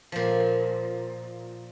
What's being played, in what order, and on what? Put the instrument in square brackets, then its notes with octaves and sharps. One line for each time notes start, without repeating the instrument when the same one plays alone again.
[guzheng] A#2 F3